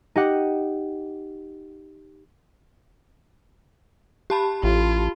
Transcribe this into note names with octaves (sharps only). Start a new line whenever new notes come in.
D#4 G4 F#5
G4 A5 B5
A1 F4